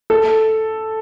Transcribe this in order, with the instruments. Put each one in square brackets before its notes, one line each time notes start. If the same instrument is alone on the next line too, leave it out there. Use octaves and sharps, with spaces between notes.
[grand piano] A4